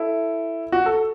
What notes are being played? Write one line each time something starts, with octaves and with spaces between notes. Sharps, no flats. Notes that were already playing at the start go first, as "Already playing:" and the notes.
Already playing: E4 A4
F#4
A4